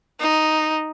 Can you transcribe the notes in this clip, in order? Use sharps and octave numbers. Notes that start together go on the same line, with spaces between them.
D#4